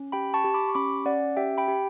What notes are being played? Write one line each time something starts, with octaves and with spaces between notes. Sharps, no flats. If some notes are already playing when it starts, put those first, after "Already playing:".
Already playing: C#4
G4 G5 B5
A5 C#6
G4
B5 D6
C#6
C#4 B5 D6
C#4 D5 F#5
G4 E5 G5
G5 B5
G4